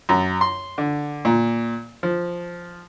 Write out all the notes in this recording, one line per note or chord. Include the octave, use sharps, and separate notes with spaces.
F#2
C6
D3
A#2
F3